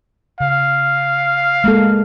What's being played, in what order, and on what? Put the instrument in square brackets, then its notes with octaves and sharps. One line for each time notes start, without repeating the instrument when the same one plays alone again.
[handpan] C#3 [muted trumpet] F5
[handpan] G#3 A#3 A4